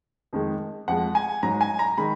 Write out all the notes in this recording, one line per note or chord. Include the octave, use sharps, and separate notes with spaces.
F2 D#3 G#3
F2 F3 G#3 F#5
G#5
G#2 F#3 A#5
G#5
A#5
D#3 G#3 B5